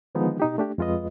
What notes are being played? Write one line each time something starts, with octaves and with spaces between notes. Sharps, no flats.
D3 D#3 F3 G#3 B3 D#4
B2 D#4 G4
A3 D4 G4
F2 G#3 F4 B4 D#5